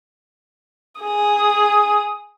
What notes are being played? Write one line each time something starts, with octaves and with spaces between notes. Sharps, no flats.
G#4 D#6